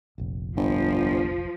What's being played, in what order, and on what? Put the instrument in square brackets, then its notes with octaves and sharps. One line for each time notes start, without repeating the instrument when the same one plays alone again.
[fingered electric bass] F1 A#1
[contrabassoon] G1 [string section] F3